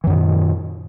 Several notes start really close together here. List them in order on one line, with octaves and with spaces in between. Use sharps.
E3 F#2 D#3 A#2